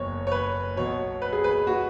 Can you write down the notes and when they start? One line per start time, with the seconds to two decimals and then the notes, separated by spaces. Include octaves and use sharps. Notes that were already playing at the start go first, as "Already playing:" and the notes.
Already playing: F#1 E2 C#5
0.27 C#5
0.32 B4
0.77 B1 B2 F#3 B3 C#5
1.22 B4
1.33 G#4
1.44 B4
1.67 F#4